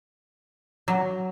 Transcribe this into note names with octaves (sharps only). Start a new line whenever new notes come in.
F#3